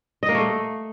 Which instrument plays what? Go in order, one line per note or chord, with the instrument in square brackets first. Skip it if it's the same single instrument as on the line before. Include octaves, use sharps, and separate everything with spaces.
[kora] D#5
A#3
A3